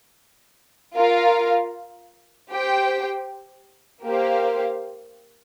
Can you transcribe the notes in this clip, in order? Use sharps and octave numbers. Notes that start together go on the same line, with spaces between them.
F4 A#4 F5
G4 C5 G5
A#3 G4 C5 F5